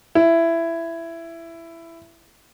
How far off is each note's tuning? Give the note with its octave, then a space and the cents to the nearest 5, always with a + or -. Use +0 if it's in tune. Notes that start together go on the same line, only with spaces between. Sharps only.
E4 +15